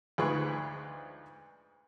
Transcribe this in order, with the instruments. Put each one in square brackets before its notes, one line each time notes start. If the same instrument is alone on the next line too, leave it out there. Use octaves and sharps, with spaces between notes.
[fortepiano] D2 G#2 F3 G#4 B4 C#6